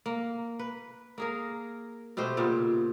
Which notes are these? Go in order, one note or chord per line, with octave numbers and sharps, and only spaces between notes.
A#3
B4
A#3 G#4 A#4
B2 A3 G4 C5
A#2 C#3 B3 G4